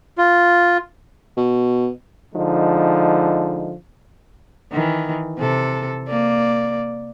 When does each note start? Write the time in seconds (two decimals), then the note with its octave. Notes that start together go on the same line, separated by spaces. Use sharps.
0.18 F4
1.37 B2
2.35 D3 F3 G#3 D#4
4.72 D#3 E3
5.38 C3 A4
6.07 A#3 D5